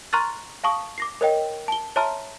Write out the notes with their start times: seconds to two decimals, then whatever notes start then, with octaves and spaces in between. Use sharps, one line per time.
0.13 A#5 C6 C#6 F6 F#6 A6
0.64 F5 A5 C#6 D#6
0.98 D6 A#6 C7
1.21 A#4 C#5 D#5 G5
1.68 A5 G7
1.96 C#5 E5 A5 A#5 C6 F6